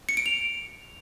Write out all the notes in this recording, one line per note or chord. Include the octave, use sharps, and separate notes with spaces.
C#7
D7
F7